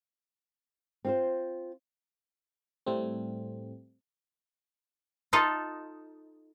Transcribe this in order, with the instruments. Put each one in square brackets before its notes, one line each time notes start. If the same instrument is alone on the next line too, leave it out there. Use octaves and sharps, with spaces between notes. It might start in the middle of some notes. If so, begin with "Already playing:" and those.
[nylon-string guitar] C4 F4 C5
[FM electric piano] A2 G3 A3 C4
[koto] D#4 F4 A4